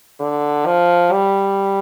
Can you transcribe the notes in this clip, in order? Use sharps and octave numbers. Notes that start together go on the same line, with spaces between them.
D3
F3
G3